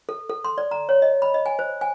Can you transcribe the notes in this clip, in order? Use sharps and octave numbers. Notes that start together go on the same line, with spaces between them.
A4
A4
C6
D5
A#5
C#5
D#5
B5
D#5
G#5
C5
G#5